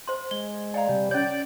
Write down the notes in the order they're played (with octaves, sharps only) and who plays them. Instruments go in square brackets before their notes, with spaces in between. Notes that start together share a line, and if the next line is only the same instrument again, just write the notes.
[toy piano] C5 C6
[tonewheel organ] G#3 [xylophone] G7
[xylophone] D5 F5 A#5 [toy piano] G#5
[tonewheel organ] C3 G3
[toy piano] C#4 C#5 [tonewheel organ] D5 [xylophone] G6